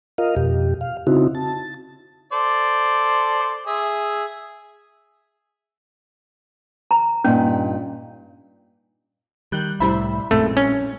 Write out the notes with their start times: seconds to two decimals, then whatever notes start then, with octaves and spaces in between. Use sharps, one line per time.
0.18 F4 A#4 D#5 F5
0.37 F2 B2 G4
0.81 F5
1.07 C#3 C4 D#4 E4 F#4
1.35 A5
2.32 A4 C5 D5
3.67 G#4 E5
6.91 A#5
7.24 G2 A#2 C#4 D#4
9.52 D#3 G3 F#6 G6
9.80 C2 A2 G3 E4 C5 E5 B5
10.31 A#1 F#2 A#2 G#3 A3 C4
10.57 C#4